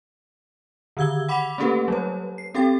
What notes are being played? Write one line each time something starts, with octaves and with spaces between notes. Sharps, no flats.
D3 D#3 E6 G#6 G7
F#5 B5 D6 B6 F7
A3 A#3 C#4 G4 A4 B4
F#3 G3 C#5
C7
C4 G4 A4 G5 A6